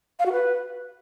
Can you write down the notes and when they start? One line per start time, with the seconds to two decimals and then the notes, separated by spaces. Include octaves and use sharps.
0.19 F5
0.26 F#4
0.32 B4